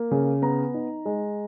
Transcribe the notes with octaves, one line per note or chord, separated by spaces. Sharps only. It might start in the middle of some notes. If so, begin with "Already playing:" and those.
Already playing: A#3
C#3
B3 A#5
D#4
G#3